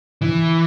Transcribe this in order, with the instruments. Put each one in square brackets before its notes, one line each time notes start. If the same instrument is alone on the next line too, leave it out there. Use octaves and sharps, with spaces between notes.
[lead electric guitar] E3